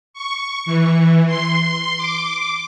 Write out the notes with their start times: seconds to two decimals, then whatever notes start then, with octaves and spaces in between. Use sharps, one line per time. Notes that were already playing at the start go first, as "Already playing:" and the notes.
0.14 C#6
0.66 E3
1.26 C6
1.98 D6